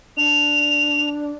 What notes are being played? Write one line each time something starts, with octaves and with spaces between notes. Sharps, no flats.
D4 F7